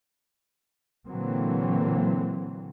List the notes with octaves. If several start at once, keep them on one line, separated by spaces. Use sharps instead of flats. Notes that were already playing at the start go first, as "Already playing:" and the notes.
A#2 D3 E3 F#3 A#3 C4